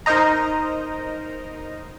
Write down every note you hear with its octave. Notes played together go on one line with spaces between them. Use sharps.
D#4 A#4 C5 D#5 A#5